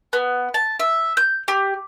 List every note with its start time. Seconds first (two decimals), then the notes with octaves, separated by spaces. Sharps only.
0.13 B3
0.54 A5
0.80 E5
1.17 G6
1.48 G4